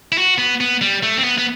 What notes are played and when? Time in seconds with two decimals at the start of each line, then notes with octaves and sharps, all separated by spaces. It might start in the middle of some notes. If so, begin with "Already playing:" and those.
0.12 E4
0.18 F#4
0.38 B3
0.61 B3
0.81 G3
1.03 A3
1.18 C4
1.24 B3
1.38 B3